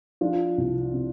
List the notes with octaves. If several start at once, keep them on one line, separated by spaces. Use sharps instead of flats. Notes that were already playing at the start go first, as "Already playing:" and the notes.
F3 D4 F4
C2
C3